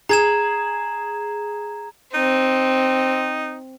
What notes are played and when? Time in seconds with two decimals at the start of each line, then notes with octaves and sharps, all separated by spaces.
0.09 G#4 A#5 G#6 E7
2.14 C4 D#4